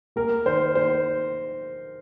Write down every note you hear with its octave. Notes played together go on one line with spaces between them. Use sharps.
A#3 A#4
D#3 C5
A#3 C5